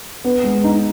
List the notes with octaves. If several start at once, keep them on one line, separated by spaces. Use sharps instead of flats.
B3
G#3
D#4